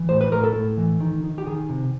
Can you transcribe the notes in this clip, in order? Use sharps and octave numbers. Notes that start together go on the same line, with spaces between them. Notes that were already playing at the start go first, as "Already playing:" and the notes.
Already playing: E3
A2 C5
B4
A2 A#4
A4
A2
E3
D#3
D#3
G4
D#3 G#4
C3